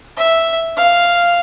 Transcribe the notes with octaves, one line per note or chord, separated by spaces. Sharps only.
E5
F5